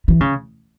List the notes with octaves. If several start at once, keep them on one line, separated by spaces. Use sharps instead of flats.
E3
C#3